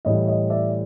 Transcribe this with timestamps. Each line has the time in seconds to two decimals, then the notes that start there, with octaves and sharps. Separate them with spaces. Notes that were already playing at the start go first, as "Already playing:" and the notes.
0.05 A2 E3 G3 C#5 D#5
0.27 C#5 D#5
0.50 D5 E5